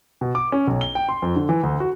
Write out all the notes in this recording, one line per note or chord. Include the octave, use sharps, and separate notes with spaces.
B2
D6
C#4
B1
G7
G5
C6
F2
D3
E3
D2
F#4